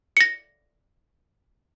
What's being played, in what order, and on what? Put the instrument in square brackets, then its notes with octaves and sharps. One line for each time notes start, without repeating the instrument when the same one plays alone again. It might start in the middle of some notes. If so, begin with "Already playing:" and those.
[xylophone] A#6 C#7